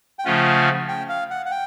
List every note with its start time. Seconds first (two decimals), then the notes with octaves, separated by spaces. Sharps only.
0.19 G5
0.25 C#3 F3 A3 C#4 F4 F#5
0.88 G5
1.09 F5
1.30 F#5
1.46 F#5
1.51 G5